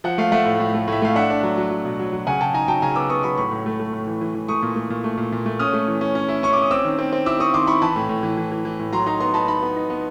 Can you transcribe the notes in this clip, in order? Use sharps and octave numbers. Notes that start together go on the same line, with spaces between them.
F3 F#5
A3 F5
A3 E5 F#5
A2
A2
A3
A2 E5
A3 F5
D4 E5 F#5
D4
F#3
F#3
F#3
B2
F#3
F#3
C#3 F#5 G#5
C#3 G5 A5
D#4 G#5 A#5
F#3 G5 A5
C#3 G#5 A#5
B3 D6 E6
B3 C#6 D#6
F#3 B5 C#6
A2 B5 C#6
A2
A3
A3
A2
E3
E3
E3
A3 C#6 D#6
A#2
A3
A#2
A3
A#2
A#2
A3
C#4 D#6 F6
A3
E3
C#4
C#4
E4
C#4 C#6
D6
C#4 D#6
C4 D6 E6
D#3
C4
C4
E4 D6 E6
C4 C#6 D#6
D#3 C6 D6
E4 B5 C#6
E3 A5 B5
A2
A2
E3
E3
E3
E3
A2
F#3 A#5 C6
D#4 A#5 C6
B3 A#5 C6
D#4 A5 B5
D#4 A5 B5
B3
D#4
B3